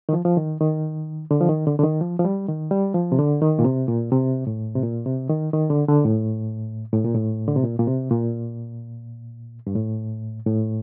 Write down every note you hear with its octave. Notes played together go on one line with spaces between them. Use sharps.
D#3
F3
F3
D#3
D#3
D3
F3
D#3
D3
D3
D#3
F3
F3
G3
D#3
G3
F3
C3
D3
D#3
A#2
C3
A#2
C3
A2
C3
A#2
C3
D#3
D#3
D3
D3
A2
A2
A#2
A2
D3
C3
A#2
A#2
C3
A#2
G2
A2
A2